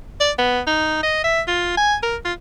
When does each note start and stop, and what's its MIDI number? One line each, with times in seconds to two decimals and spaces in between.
0.20 0.32 74
0.39 0.60 59
0.67 1.01 63
1.03 1.21 75
1.24 1.41 76
1.48 1.74 65
1.77 1.96 80
2.03 2.16 70
2.25 2.33 65